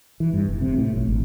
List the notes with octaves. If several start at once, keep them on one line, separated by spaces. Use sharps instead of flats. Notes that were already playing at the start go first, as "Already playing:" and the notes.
E3
G2
F1
C3
A2
A#1
G#1